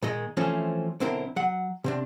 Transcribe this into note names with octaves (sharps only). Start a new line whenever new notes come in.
A#2 D#3 G#3 D#5
E3 F3 A3 C4 C#4
B1 D3 C4 E4 A#4
F#3 F#5
C3 C4 D4